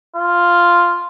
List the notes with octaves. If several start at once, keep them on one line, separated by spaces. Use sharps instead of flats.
F4